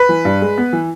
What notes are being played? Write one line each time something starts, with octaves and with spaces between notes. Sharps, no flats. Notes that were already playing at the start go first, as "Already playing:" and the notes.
Already playing: B4
E3
G2
G#3
B3
E3